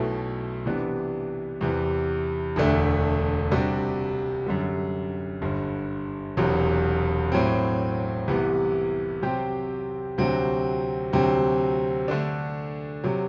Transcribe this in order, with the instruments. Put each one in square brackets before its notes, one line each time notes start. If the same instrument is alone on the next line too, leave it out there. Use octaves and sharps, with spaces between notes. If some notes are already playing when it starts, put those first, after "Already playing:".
Already playing: [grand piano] B1 B2 A3 E4 A4
C3 E3 B3 D4
E2 C3 E3
E1 D2 D3 A3 D4
C3 G3 D4 F#4
F#2 D3 G3
G1 G2 D3
E1 E2 C3 F#3
A2 F#3 C4
C2 C3 E3 B3
C3 F#3 C4 G4 C5
D2 C3 F#3 C4 F#4
D2 C3 F#3 C4
D3 A3 D4
C3 F#3